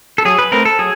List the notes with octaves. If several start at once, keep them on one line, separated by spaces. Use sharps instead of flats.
A4
F#3 G#4
B4
A3 C4 A#4
A4
F#3 G#4